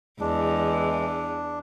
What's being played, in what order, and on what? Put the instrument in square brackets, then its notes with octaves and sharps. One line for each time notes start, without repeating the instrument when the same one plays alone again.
[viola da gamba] E2 E3 [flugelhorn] G#3 [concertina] D4